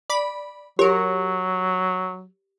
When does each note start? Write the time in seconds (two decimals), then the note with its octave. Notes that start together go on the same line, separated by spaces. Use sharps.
0.10 D5 B5
0.79 F#3 G4 A#4 C#5